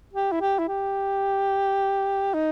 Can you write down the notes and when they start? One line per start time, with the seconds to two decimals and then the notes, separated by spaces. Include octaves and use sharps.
0.13 G4
0.32 E4
0.41 G4
0.59 E4
0.68 G4
2.34 D#4